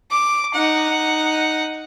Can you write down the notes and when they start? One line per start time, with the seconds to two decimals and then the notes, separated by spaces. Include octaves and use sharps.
0.11 D6
0.54 D#4 F#5